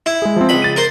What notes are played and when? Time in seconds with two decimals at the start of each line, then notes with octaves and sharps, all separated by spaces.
0.06 E4
0.22 G#3 G#4
0.36 F3 C4
0.49 C#2 B5
0.62 A6 D#7
0.76 A#4 C5